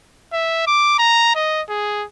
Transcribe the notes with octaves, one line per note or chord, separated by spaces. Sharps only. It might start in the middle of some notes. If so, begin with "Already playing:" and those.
E5
D6
A#5
D#5
G#4